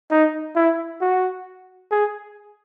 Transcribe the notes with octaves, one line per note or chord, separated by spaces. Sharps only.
D#4
E4
F#4
G#4